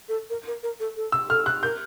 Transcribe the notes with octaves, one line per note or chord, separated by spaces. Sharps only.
A4
A#4
A#4
A#4
A4
A4
E6
A4 F6
F#6
A#4 G6